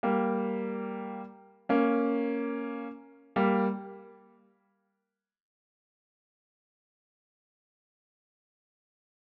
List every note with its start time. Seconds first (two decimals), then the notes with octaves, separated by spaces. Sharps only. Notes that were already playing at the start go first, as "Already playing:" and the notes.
0.03 G3 A#3
1.69 A#3 C#4
3.36 G3 A#3